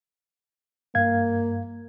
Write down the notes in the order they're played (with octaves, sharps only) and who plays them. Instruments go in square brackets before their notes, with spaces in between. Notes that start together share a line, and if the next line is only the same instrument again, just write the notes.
[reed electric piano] G2 F5 G#6 [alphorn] A#3